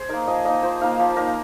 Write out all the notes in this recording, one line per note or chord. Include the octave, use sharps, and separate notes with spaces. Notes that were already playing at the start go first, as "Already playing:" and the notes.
Already playing: G#4 C5
A#3 D#4 A#4
F3 D#5
A#3 D#4 D#5
F3 C5
A#3 D#4 F5
F3
A#3 D#4 A#4